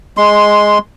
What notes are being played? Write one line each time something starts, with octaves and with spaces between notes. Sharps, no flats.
G#3 C6